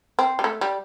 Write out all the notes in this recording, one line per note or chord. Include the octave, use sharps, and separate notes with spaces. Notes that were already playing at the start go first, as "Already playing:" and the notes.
C4
G3
A3
G3